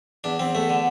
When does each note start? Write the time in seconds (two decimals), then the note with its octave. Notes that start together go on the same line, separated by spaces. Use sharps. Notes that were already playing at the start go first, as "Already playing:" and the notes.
0.24 E2 D4
0.39 E2 C4
0.55 E2 A3
0.69 D3